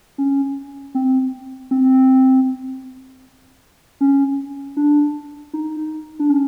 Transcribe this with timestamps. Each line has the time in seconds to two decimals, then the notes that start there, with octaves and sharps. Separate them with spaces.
0.18 C#4
0.95 C4
1.71 C4
4.01 C#4
4.77 D4
5.53 D#4
6.19 D4
6.30 C#4